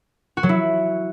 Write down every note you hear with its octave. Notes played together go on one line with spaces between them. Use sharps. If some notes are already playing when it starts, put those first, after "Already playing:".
F#4
F#3
E4